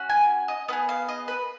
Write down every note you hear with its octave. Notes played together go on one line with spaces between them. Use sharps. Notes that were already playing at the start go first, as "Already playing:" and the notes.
Already playing: C#4 F#4
G#5
D#5
B3 F4 G#4
F5
D#5
B4